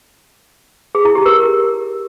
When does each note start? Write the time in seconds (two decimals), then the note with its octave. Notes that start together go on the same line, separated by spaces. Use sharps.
0.95 G#4
1.05 E4
1.15 G4
1.26 A#4